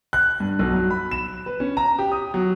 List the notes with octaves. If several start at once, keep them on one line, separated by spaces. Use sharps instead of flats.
F#6
G2
B1
F#3
B5
E7
B4
C#4
A#5
G4
D#6
F#3